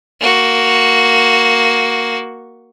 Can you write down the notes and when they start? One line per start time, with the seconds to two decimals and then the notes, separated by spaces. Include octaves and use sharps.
0.21 A#3 F#4